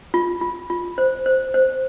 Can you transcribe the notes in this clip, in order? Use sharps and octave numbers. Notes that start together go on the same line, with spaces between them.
F4
F4
F4
C5
C5
C5